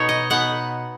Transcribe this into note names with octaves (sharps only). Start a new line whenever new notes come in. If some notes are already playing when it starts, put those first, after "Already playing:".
Already playing: B2 B3 D#4 C#5
D#5
B2 B3 D#4 F#5